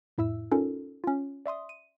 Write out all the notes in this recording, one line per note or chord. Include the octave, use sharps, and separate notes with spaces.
F2 A2 E4 E5 E6
C#4 D#4 F4 A4 A#4
C#4 F4
D5 E5 C6 D#6
D#7